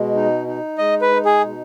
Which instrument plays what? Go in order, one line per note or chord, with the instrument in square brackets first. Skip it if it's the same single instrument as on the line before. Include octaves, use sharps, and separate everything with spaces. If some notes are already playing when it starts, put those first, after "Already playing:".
Already playing: [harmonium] B2 G#3
D#4
D#4
[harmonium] G#3 [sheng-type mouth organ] D#5
[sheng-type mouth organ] B4
[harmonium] D#4
[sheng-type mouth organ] G#4
[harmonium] B2